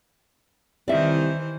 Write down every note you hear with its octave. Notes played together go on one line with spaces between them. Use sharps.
C2 D#3 E3 C5 D5 E5